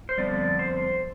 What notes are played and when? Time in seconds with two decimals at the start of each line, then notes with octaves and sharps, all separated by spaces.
0.09 C5
0.17 F2 D3 G3 B3 D5
0.59 C5